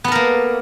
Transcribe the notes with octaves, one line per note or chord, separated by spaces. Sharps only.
A#3 B3 A4 A#4